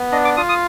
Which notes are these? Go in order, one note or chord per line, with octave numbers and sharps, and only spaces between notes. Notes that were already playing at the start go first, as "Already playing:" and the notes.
Already playing: B3
D4 D#5
D6
F4 D#6
D#6